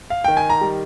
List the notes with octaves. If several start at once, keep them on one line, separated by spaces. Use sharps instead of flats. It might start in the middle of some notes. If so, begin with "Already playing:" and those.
F5
D#3 G5
G#5
A#5
G3